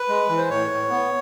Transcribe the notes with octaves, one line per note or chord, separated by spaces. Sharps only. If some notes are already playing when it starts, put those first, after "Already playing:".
Already playing: B4
G#3
E3
C5
A2 C#5
A2
B3